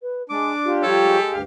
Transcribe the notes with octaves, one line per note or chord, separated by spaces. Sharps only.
B4
G#3 D4 D6
F4 G4
F3 G3 A4 C#5
G#3
D2 G2 F5